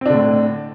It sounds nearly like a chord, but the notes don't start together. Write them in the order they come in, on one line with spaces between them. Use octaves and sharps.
C4 D4 D3 A2